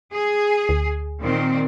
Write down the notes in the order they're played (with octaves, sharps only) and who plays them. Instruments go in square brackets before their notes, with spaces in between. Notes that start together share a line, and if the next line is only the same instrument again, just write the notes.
[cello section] G#4
[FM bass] D2
[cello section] A#2 D#3 C4